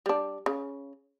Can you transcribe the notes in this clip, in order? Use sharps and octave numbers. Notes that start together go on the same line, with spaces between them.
G3 D4
C#3